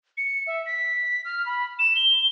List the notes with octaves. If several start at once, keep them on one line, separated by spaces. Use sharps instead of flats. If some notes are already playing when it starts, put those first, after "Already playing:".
C#7
E5
B6
F6
B5
E7
G7